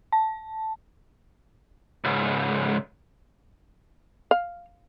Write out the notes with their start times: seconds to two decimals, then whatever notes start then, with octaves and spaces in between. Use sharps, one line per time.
0.12 A5
2.04 C#2 G#2
4.31 F5